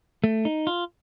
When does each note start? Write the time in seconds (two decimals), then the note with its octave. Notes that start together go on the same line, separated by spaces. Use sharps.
0.24 A3
0.45 D#4
0.67 F4